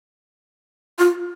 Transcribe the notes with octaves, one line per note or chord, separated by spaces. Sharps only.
F4